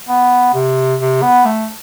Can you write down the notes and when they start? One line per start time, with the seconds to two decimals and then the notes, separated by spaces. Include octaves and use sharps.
0.09 B3
0.54 C3
1.00 C3
1.22 B3
1.45 A3